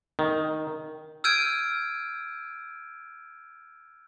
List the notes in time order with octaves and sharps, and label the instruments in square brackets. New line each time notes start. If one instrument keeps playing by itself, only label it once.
[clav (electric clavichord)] D#3
[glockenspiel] E6 F6 G6 G#6 D7 D#7